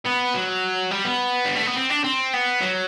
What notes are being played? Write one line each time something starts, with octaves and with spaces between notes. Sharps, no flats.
B3
F#3
G3
B3
G3
A3
B3
C4
D4
C4
B3
F#3